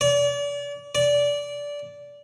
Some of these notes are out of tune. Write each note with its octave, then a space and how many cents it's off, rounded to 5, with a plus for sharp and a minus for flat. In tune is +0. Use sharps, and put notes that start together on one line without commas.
D5 -35
D5 -15